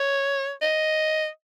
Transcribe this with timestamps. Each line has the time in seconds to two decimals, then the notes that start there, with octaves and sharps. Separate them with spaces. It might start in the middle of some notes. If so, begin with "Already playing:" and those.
Already playing: C#5
0.62 D#5